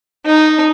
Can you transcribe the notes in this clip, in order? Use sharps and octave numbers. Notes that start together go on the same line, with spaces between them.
D#4